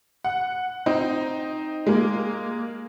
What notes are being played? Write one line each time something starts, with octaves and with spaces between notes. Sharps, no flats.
F#5
C4 D#4
G#3 A#3